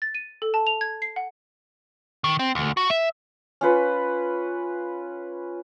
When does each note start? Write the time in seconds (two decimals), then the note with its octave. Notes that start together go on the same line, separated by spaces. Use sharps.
0.02 A6
0.15 D#7
0.42 A4
0.54 A5
0.67 F7
0.81 G#6
1.02 C7
1.16 F#5
2.24 D#3
2.39 C4
2.55 D2
2.77 F#4
2.90 E5
3.61 C#4 F4 B4